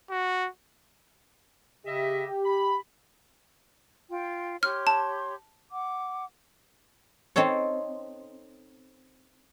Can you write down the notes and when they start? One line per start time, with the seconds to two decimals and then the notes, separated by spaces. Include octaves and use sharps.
0.10 F#4
1.85 C#3 G4 D#5 E5
2.44 B5
4.09 F4 G5
4.63 G4 C#5 C6 F6
4.87 A5
5.72 F#5 D6
7.36 C4 D#4 A4 C#5